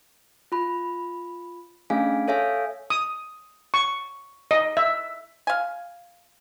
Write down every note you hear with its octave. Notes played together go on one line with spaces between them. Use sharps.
F4 B5
A3 C#4 D4 G#4 F5 G#5
A4 C#5 E5 F5 G#5
D#6
C#6
D#5
E5
F5 G#5